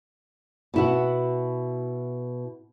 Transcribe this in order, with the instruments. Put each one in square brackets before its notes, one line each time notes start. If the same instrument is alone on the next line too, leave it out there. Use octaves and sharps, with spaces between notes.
[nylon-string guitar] B2 E4 F#4